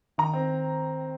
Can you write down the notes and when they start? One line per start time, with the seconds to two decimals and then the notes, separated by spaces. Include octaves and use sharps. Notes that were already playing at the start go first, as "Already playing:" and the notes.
0.18 D#3 A#5
0.34 C4